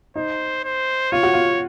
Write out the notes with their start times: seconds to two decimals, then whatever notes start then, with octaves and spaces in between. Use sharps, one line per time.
0.16 D#4 C5
0.64 C5
1.12 F4 C#5
1.23 F#4
1.34 F4